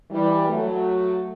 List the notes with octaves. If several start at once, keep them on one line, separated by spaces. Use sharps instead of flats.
E3 G3
F#3 A3